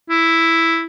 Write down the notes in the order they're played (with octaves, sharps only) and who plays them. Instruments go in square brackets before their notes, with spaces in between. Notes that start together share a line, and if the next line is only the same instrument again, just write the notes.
[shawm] E4